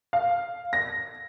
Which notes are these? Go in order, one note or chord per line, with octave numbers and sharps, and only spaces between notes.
F5
A#6